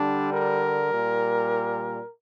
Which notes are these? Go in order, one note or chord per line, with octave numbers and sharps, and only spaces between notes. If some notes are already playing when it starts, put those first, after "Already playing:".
Already playing: D3 G3 D4
A#4
A#2 G3